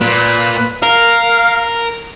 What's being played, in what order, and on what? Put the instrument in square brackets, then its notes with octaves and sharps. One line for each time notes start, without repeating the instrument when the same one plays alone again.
[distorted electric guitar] A#2 [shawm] B4
[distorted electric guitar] A#4 [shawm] F5